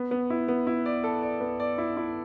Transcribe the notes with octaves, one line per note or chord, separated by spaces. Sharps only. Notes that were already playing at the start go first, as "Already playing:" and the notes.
Already playing: B3
B3
E4
B3
E4
D5
A4
D5
B3
D5
E4
E4